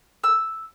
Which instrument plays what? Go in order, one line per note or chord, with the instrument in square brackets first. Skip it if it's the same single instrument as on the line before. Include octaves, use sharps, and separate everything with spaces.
[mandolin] E6